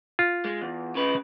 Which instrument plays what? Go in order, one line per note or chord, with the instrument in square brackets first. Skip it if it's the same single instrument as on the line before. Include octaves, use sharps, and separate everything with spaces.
[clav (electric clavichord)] F4
[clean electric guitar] G#3
E2
C#3 B4